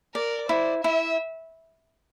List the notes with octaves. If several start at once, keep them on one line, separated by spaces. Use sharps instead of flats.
A#4 D5
E4 C5
E4 E5